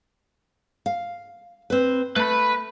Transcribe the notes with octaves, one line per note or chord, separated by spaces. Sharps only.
F5
C4 B4
A3 B4 B5